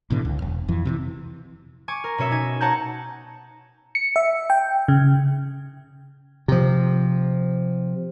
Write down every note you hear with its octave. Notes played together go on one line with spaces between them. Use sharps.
A1 B2 D3 E3
C#2
E1
F2 E3
C3 D#3 E3
G#5 C#6 D6
A#4
B2 C#4 C#5 E5
D#4 G#5
C#5 F#5 A5 A#5 G6
C#7
E5
G5
C#3
C3 F3